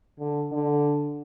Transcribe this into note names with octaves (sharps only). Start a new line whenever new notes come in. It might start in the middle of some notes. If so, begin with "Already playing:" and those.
D3
D3